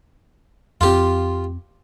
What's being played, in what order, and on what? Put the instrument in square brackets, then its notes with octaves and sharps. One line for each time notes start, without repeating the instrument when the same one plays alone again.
[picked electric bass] F2 C4 [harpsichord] F4 G4